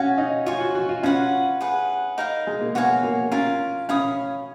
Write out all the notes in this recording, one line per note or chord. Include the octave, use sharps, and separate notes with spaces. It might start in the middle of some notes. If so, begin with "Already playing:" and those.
Already playing: C#4 F#4 C#5 F5 G#5
D#4
F4 C#5 G#5 C#6
F#4
F#4
F4
C#4 F4 B4 F#5
G#4 B4 F#5
D#4 A#4 F5
G#3
A#3
B3 F#4 C#5 F5 G#5
A#3
C#4 F4 A#4 F5
C#4 C#5 F5 B5 D#6